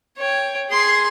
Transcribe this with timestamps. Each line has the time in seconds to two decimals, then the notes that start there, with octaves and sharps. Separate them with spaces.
0.17 C#5 G5
0.69 G#4 C6